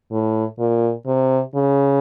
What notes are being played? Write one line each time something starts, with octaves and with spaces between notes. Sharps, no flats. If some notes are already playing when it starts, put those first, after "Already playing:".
A2
A#2
C3
C#3